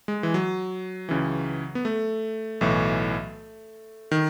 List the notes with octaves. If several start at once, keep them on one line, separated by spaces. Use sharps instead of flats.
G#3
E3
F#3
C#2 C#3 E3
B3
A3
B1 A2 E3
D#3